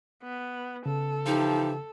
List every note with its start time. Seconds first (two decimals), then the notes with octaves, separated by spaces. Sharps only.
0.23 B3
0.86 C#3 A4
1.26 E3 F3 D#4 G4